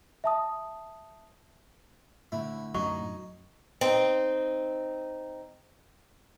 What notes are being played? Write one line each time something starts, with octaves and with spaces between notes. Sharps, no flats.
E5 A5 D#6
A2 D3 E4
F#2 F#3 D#4 C#6
C4 D#4